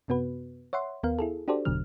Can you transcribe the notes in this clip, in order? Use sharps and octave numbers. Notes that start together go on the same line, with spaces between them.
F#2 C3 B3 F#4 B4
C#5 E5 F#5 C6
D#2 B3 A#4 F5
E4 G#4 A4
D4 F#4 G4 A4 C5 D5
G1 E2 B2 D3 F#3 F6